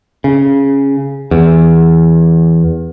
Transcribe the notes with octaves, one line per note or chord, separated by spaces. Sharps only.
C#3
E2